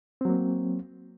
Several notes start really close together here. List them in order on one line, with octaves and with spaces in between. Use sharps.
C4 F#3 A#3